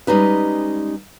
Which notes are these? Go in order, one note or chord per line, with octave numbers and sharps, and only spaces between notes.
G3 G#3 C#4 D#4 B4